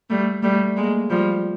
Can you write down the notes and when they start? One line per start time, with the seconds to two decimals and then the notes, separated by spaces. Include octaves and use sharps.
0.10 G3 A3
0.43 G3 A3
0.76 G#3 A#3
1.10 F3 G3